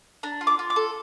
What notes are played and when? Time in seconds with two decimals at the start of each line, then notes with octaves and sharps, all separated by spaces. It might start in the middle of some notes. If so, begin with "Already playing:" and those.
0.23 D4 A#5
0.41 F4
0.47 D6
0.59 F4
0.70 D6
0.76 A4